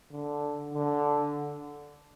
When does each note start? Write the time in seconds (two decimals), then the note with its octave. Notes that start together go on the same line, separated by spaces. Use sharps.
0.12 D3
0.74 D3